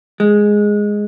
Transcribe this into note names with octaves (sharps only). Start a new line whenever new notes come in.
G#3